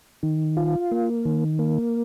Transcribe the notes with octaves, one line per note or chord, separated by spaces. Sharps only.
D#3
F4
A#3
D#3
A#3